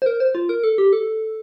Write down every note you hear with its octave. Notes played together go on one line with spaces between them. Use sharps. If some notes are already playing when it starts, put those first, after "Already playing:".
C5
A#4
C5
F4
A#4
A4
G4
A4